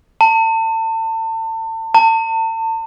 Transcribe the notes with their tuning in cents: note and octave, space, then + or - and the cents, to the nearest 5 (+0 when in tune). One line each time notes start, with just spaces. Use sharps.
A5 +35
A5 +40